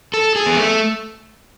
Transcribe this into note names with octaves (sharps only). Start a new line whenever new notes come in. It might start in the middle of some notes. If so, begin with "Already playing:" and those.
A4
G#4
B3
A3